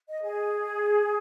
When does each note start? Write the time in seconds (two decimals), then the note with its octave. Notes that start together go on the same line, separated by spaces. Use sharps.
0.09 D#5
0.24 G#4